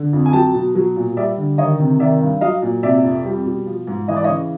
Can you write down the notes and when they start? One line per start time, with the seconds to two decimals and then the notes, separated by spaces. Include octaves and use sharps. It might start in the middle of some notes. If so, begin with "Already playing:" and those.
Already playing: D3
0.13 F2
0.26 G#5
0.33 F#3 G5 A5
0.54 B2
0.75 F#3
0.96 A#2
1.17 G3 D5 E5
1.37 D3
1.58 D#3 C#5 D#5
1.79 C3
2.00 D#3 D5 E5
2.20 G2
2.41 F#3 D#5 F5
2.62 A#2
2.83 C3 D5 E5
3.04 F2
3.25 G3
3.45 B2
3.66 F3
3.87 G#2
4.08 E3 D#5
4.16 D5
4.24 C#5 D#5
4.28 C#3